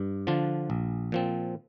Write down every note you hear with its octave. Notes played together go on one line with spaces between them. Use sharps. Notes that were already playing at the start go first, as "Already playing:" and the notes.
Already playing: G2
D3 F3 D4 F4
A#1
A#2 F3 C4